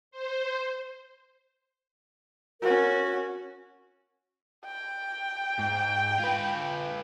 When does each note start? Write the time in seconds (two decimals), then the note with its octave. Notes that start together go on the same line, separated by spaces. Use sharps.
0.11 C5
2.62 C#4 F#4 A#4
4.66 G5
5.59 G#2
6.19 F4 B4